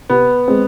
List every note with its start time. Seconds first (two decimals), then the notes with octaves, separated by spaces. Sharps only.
0.09 C3 B3
0.48 G#3 C4